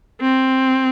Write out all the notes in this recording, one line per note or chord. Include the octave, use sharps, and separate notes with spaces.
C4